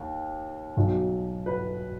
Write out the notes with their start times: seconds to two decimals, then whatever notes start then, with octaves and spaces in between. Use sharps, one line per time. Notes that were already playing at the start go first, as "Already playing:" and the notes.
Already playing: D#2
0.77 B1 B2 F#3
1.46 B4